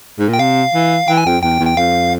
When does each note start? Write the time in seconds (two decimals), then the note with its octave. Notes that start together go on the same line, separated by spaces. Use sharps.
0.19 G#2
0.29 A#2 G5
0.39 C3 F5
0.74 E3
1.08 E3 G5
1.18 G#5
1.26 F2 G5
1.42 E2 G5
1.60 E2
1.66 G5
1.77 F2 F5